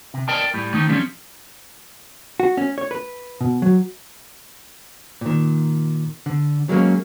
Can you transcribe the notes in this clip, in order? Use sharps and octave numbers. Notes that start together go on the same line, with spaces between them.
C3
A#4 D5 D#5 G5 A5
A2 G3
D#3 A3 D#4
D3 F3 G3 A3 C4 C#4
F#4
C#4
C#5
B4
B2
F#3
A#2 D#3
D3
F#3 G#3 A#3 C#4